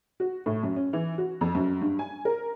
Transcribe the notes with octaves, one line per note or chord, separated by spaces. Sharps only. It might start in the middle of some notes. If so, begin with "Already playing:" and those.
F#4
A2
F#2
C#4
E3
F#4
F2
F#2
G2
G#5
A#4